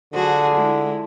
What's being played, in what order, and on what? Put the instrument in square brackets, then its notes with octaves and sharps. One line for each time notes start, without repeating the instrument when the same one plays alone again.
[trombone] D3 [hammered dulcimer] F3 [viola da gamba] F#3 F#4 G#4
[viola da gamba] G#3 E4